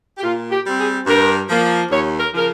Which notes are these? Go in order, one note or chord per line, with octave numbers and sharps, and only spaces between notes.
G4
A#2 F4
G4
G3 C4
G#4
G2 A#4
F3 A#3
D#2 C#5
A#4
C#3 F3 A#4